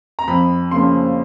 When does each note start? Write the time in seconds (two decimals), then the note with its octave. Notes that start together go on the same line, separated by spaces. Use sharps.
0.19 A#5
0.28 F2 B5
0.71 C#3 F3 A#3 C#4 C6